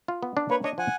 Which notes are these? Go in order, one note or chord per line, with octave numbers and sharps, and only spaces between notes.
F4
B3
D4
A#3 B4 C#5
D4 C#5 D#5
F3 F#5 G#5